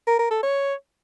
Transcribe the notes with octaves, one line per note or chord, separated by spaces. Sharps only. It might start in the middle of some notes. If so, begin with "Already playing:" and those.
A#4
A#4
A4
C#5